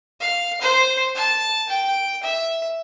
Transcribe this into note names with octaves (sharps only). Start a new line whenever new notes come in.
F5
C5
A5
G5
E5